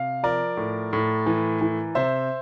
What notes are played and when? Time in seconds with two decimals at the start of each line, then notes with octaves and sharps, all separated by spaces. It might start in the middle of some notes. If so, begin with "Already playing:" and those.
Already playing: C3 F5
0.23 F3 A#4 D5
0.57 A2
0.93 A2
1.26 E3
1.61 E3
1.95 C3 C5 E5